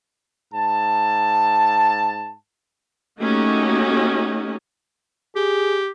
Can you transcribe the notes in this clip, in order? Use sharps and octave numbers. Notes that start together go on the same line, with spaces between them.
G#2 A5
A3 A#3 C#4 D#4 F#4 G4
G4 G#4